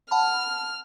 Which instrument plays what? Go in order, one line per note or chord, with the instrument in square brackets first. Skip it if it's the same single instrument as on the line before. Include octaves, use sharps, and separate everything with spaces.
[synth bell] F#5 A5 B5 [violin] F6